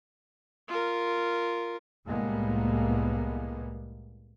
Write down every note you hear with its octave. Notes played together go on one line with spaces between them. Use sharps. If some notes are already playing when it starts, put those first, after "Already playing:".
F4 A#4
C2 A2 G3 G#3 A#3 B3